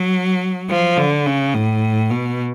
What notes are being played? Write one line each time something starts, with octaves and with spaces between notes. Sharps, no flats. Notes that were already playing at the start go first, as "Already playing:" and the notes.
Already playing: F#3
F3
D3
C#3
A2
B2